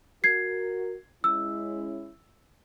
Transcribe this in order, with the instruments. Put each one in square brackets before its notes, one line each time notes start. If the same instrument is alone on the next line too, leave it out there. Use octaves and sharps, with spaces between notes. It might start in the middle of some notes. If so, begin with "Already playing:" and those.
[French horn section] F#4 A#4 [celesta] G#6 C7
[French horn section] G#3 C#4 E4 [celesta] E6